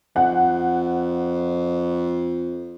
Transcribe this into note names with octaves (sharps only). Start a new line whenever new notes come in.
F2 F#5